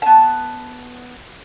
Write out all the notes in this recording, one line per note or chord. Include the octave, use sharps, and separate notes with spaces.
B3 A5